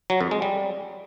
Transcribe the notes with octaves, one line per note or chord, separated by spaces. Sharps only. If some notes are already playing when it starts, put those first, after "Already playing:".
F#3
F2
G#3
G3